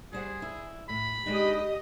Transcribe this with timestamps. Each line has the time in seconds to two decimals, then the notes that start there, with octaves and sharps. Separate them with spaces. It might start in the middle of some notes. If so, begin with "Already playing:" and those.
0.13 G3 G#4 C5 F#5
0.42 E4
0.89 A2 B5
1.26 G#3 D4 D#4 G4 D#5